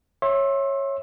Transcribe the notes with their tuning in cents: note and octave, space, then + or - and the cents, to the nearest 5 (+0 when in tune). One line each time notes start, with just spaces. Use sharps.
C#5 -15 E5 +0 C6 +40